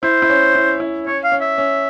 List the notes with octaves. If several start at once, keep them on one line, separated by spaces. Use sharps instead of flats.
E4 C5
E4
C#4
E4
E4
C#4 C#5
F5
C#4
E5
C#4